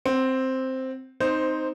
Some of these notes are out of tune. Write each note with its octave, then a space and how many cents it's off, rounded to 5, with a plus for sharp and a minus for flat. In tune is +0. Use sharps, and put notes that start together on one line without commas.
C4 +0 F#5 +30
C4 -15 D#4 +0 C5 +0